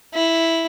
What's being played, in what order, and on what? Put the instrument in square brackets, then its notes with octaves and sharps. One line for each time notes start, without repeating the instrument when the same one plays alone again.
[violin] E4